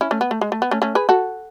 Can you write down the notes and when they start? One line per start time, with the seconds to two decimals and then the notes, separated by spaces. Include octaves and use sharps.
0.01 C#4 E4
0.11 A3 C#4
0.21 B3
0.31 A3
0.41 G#3
0.52 A3
0.62 B3
0.71 A3 C#4
0.82 A3 C#4
0.95 G#4 B4
1.09 F#4 A4